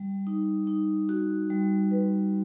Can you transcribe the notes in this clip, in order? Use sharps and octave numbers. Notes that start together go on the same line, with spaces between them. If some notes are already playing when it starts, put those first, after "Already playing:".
Already playing: G3
D#4
D#4
F#4
G3
B4